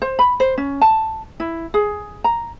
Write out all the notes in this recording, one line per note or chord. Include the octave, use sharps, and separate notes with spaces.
C5
B5
C5
C#4
A5
E4
G#4
A#5